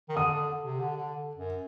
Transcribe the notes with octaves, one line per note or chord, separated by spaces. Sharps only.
D#3
D3 D#6
D3
C3
D3
D3
F#2